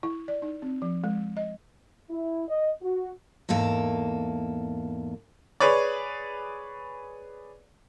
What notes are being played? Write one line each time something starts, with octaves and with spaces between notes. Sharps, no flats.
E4
D5
D#4
C4
F3
G#3
D#5
E4
D#5
F#4
E2 G#2 A#3 A4
G#4 B4 C#5 D5